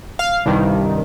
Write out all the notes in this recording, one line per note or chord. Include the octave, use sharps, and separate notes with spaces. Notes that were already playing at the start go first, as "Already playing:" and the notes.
F5
C2 G2 D#3